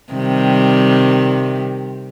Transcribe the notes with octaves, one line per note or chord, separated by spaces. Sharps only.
C3 D#3 G3